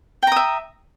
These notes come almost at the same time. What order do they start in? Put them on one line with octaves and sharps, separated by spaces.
G5 A#5 D#6 E5